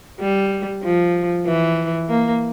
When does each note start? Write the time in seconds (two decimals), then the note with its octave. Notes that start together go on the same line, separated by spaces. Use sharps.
0.21 G3
0.83 F3
1.46 E3
2.09 A#3